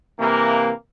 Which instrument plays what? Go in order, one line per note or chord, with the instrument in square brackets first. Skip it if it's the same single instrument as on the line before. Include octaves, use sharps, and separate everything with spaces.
[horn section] C3 E3 A#3